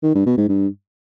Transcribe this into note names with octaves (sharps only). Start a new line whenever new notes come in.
D#3
G2
B2
G#2
G2